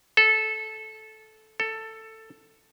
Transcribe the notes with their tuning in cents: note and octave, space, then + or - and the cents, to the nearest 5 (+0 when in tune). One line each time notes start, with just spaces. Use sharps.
A4 -15
A4 +10